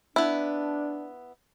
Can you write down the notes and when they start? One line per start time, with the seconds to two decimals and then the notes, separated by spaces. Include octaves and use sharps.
0.16 B3 D4 E4